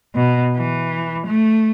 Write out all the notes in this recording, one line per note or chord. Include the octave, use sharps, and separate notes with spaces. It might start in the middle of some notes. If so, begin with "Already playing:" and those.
B2
E3
A3